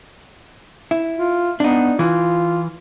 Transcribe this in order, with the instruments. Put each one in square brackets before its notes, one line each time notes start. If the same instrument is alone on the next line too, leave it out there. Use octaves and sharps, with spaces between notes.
[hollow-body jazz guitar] E4
[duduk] F4
[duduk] B3 [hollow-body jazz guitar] D4 D#4
[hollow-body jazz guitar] E3 [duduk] F4